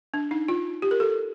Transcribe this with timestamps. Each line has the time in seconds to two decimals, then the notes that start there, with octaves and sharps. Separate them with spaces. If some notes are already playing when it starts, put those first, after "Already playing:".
0.14 D4
0.31 D#4
0.48 F4
0.82 G4
0.91 A#4
1.00 A4